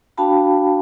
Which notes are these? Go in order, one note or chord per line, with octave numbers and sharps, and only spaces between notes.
D4 F#4 F5 G5 A5 B5